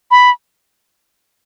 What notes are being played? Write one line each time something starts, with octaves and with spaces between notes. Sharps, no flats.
B5